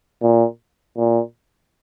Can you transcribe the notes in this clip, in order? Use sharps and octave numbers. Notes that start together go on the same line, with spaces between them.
A#2
A#2